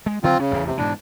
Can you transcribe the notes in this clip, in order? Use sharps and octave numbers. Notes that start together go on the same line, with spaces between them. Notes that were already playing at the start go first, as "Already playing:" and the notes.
G#3
D3 F#3 C4 F4
C#3 C#4
A1 E2 A2
C3
G#2 B2 E3 D4